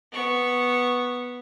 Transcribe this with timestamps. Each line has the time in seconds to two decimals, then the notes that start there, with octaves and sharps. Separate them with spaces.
0.12 B3 C#6